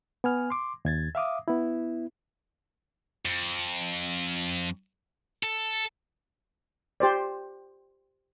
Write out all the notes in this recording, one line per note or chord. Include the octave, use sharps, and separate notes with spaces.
B3 G#5 F6
C6 D6
D#2 G#6 A6
E5 F5 D6 D#6
B3 E4
F2
A4
G4 C5 D5